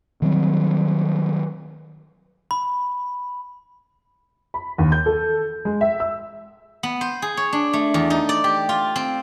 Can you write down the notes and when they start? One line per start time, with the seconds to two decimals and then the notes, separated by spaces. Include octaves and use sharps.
0.22 D#3 F#3 G3 C4
2.51 B5
4.54 B5
4.78 D#2
4.92 G6
5.06 A4
5.65 G#3
5.81 E5
6.00 E6
6.83 B3
7.01 C5
7.22 G#4
7.37 C#5
7.53 D4
7.73 A3
7.94 E2
8.10 D#4
8.29 D5
8.44 G4
8.69 F4
8.96 C4